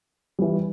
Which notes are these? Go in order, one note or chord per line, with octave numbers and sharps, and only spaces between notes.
E3 G3